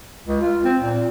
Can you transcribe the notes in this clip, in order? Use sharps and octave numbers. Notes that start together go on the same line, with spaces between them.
C#2
F4
C4
A#2